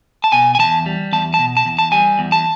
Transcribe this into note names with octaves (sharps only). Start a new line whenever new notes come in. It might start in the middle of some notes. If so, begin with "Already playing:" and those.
A5
B2 G#5
G#5
E2 A5
G3
E2 A5
B2 A5
A5
E2
A5
G3 G#5
E2
A5